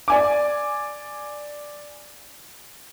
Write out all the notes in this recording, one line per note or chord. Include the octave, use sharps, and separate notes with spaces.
D5 G#5 D6